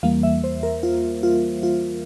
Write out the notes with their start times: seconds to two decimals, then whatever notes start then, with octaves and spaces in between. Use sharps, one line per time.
0.03 E2 E3 G3 A#3 F5
0.23 E5
0.44 C5
0.63 A#4
0.83 F4
1.23 F4
1.63 F4